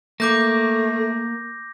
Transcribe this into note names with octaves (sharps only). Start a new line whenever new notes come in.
A3 A#3 D6 G6 A#6